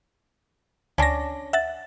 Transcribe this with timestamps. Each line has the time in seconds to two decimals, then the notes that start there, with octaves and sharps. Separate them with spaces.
0.98 D2 C#4 D4 A#6
1.53 E5 F#5 A6